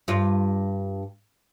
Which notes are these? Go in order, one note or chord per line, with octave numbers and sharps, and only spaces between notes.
G2 F4